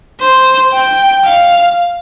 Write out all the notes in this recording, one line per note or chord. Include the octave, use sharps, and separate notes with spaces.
C5
G5
F5